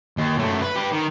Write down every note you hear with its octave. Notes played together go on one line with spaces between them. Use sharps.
D#2
F#2 A3
B4
G4 B4
D#3